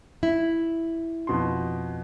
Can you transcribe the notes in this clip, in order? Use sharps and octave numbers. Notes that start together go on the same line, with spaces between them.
E4
F2 B2 C6